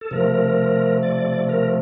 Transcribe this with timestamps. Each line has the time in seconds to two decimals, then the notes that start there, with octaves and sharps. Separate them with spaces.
0.01 A4
0.11 C3 F3 A3 A#4
1.03 D5
1.49 A#4